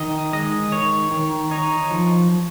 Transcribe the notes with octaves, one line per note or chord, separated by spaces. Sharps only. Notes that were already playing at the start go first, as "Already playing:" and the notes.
Already playing: D#3 D#5
G#3 D#5
D#3 C#5
D#3
D#4 C#5
F3